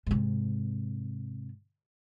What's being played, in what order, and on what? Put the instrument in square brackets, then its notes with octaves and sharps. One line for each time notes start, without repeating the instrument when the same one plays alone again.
[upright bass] G#2 C3